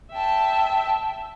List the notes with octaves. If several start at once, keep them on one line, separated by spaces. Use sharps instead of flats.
E5 G5 A5